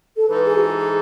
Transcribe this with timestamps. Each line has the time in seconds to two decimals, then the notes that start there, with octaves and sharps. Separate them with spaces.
0.16 A4
0.28 G#2 E3 G#3 D#4 A4 B4
0.44 G#4
0.57 F#4
0.61 G#4
0.77 G#4